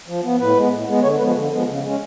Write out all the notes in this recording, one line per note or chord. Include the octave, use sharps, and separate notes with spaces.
F3
B3
A2 B4
G#3 B3
A2
G#3 B3
D3 C#5
F3 G#3 B3 B4
D3
F3 G#3 B3
C#3
G#3 C#4